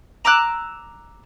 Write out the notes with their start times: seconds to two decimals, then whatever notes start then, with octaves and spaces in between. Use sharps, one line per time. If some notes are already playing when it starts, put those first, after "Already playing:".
0.25 A#5 D6 E6 F#6